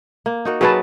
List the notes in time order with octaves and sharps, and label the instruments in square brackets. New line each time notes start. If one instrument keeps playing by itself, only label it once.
[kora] A#3
D#4 F#4 A#4
[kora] F#3 C#4 F#4 [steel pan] G#4 B4 A5